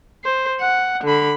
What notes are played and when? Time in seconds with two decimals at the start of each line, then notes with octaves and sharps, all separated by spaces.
0.24 C5
0.61 F#5
1.04 D3 B5